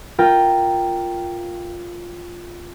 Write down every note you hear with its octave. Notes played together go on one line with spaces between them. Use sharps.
F4 A#4 G5